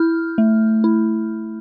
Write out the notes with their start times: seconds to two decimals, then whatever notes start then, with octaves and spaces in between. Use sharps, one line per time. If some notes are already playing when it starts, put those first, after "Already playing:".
Already playing: E4 F6 G6
0.38 A3
0.84 E4